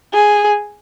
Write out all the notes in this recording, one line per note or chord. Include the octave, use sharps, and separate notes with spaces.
G#4